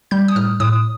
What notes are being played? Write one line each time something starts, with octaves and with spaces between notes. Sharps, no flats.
G3 G6
D#6
A2 F6
A2 D#6